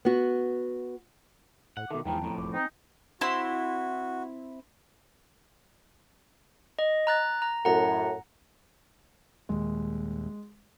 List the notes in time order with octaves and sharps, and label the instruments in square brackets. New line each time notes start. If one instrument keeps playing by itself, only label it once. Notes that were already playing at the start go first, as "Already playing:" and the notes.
[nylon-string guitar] B3 F#4
[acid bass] A2 [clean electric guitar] F#5
[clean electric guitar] B2 D#3 [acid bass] A4 [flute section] E5 D6
[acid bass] E2 [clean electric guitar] G#2 E3 F3 [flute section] G5 A5 A#5
[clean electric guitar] F2 A2
[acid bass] E1 [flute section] C5 D6
[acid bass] C4 [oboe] D#4 [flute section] G5 G#5 A#5
[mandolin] C4 E4 C6 [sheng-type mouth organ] F#4
[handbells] D#5
A#5 F#6 A6
A#5
[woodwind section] F#2 A2 [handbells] F#5 A#5
[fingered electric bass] D#1 D#2 [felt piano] G#3